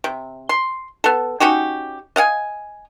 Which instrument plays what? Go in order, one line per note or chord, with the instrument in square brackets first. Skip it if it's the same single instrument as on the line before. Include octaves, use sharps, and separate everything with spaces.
[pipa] C3
C6
B3 A4
C#4 D#4 F#4 G4
D#5 F5 F#5 G#5